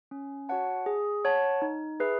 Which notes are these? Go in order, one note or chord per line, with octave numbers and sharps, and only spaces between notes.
C#4
F#4 C#5 F#5 A5
G#4
C#5 F#5 A5
D#4
G#4 B4 E5